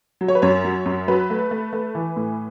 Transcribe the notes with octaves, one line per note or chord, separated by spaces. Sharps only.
F#3
C#5
B4
F#2 C#5
F#3
F#2
F#3 B4
A3
A3
A3
E3
A2